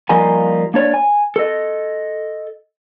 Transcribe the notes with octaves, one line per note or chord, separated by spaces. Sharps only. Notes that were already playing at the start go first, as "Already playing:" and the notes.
F3 G3 A#3 D#4 G#5
A#3 D4 C#5 D5
G#5
A4 D#5